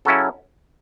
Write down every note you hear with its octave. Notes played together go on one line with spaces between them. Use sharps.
C#3 F#3 C#4 E4 A4